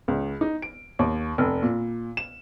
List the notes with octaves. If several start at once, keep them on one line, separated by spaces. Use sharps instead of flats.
C#2
D#4
D7
D#2
F1
A#2
E7